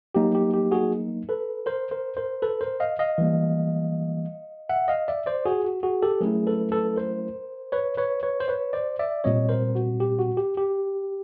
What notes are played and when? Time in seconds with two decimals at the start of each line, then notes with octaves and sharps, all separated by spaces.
0.15 F#3 A#3 D#4 G4
0.35 G4
0.54 G4
0.71 F#4 G#4
1.29 A4 B4
1.66 A#4 C5
1.91 A#4 C5
2.17 A#4 C5
2.42 A4 B4
2.61 A#4 C5
2.80 D#5 F5
2.99 D#5 F5
3.18 E3 G3 A#3
4.69 E5 F#5
4.88 D#5 F5
5.08 D5 E5
5.26 C5 D5
5.45 F#4 G#4
5.65 F#4
5.83 F#4 G#4
6.02 G4 A4
6.21 F#3 A3 C#4 E4 G#4 A#4
6.47 A4 B4
6.72 A4 B4
6.96 A#4 C5
7.72 B4 C#5
7.97 B4 C#5
8.23 B4 C#5
8.40 C5
8.48 B4 C#5
8.73 C5 D5
8.99 D5 E5
9.24 A#2 G3 C4 C#5 D#5
9.49 A#4 C5
9.75 F#4
10.00 G4
10.19 F#4
10.37 G4
10.57 G4